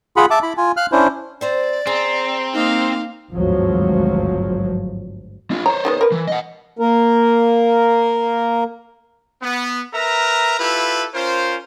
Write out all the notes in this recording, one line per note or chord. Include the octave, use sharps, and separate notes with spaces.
F4 G#4 F#5 B5
E5 A5 D6
E4 B5
F4 G#5
F5 F6 F#6
C#4 D4 E4 C5
C4 C5 D5 A#5
C4 G#4 A#5
A#3 D#4 F5
G#1 D2 G2 F3 F#3
D4 F4
C5 C#5 A#5
D#3 G#3 B3
A#4 B4
E3
D#5 F#5
A#3 A#4
B3
A#4 B4 E5 A#5
E4 F4 G4 A4 B4
C#4 F4 A#4 C5